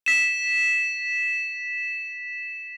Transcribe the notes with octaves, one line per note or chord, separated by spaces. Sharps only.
B6 E7